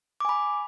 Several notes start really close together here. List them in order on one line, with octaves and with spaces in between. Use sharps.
D6 G#5 B5